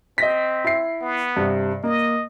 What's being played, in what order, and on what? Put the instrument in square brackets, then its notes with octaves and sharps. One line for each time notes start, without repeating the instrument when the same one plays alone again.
[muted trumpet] C4 [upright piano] D#5 A#6 B6
[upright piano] E4 C7
[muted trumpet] B3
[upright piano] G2 C3
[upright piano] A#3 [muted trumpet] D#5